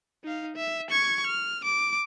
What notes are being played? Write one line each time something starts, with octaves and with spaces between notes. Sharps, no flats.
D#4 F5
E5
C#6 G#6
F6
D6